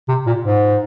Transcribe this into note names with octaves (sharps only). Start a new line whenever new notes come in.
C3
A#2
G#2